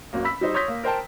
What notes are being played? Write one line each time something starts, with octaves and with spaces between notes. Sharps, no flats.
F#1 F#3 A#3
B5 E6 B6
G3 D#4 C5
C#5 C6 D#6 G6 A#6 B6
A#3
A#4 C5 G5 A5